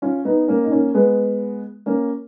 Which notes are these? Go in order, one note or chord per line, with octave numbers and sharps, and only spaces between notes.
C#4 F4
B3 D#4
A#3 C#4
D#4
A#3 C#4
G#3 B3
A#3 C#4